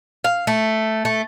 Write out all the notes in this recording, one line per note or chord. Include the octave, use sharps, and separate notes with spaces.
F5
A3
A3